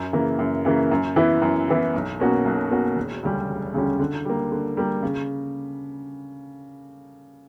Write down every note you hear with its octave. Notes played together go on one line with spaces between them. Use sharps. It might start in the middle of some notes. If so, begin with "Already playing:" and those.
Already playing: F#2
C#3 E3 A#3
F#2
C#3 E3 A#3
F#2
E3 B3 E4
F#2
E3 B3 E4
B1
B2 A#3 C#4 F#4
B1
B2 A#3 C#4 F#4
E1
D2 C#3 G3 C#4
E1
D2 C#3 G3 C#4
D3
G3 A#3
D3
G3 A#3
C#3